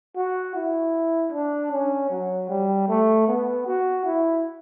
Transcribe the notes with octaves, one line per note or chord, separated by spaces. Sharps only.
F#4
E4
D4
C#4
F#3
G3
A3
B3
F#4
E4